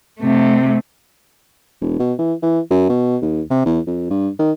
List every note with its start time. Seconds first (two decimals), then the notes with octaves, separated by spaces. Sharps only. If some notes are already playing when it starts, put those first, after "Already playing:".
0.20 C3 A3
1.82 E1
2.00 B2
2.19 E3
2.43 E3
2.71 F#2
2.89 B2
3.22 D#2
3.50 C3
3.66 E2
3.87 F2
4.10 G2
4.39 D#3